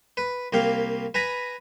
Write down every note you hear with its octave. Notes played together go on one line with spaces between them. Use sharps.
B4
C2 A#3 G4 F5
B4 G#5 A#5 B5